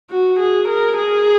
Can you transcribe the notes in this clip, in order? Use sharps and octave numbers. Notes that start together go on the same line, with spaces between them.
F#4
G#4
A#4
G#4